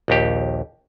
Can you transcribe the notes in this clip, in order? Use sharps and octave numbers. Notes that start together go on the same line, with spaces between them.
A#1 D#2 G4